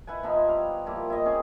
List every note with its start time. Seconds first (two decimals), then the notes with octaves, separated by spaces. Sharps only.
0.07 E4 B4 F#5 G#5
0.23 F3 B3 D#4 E4
0.47 G3 F5
0.86 F3 G3 A#3 E4
1.10 E4 D#5
1.25 C4 C#4 G#4